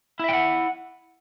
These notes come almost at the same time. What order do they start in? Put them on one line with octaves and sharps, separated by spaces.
E4 E5 G5 F#5